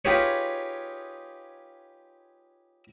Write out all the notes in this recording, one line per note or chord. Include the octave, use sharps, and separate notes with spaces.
D#4 F4 G4 G#4 B4 C#5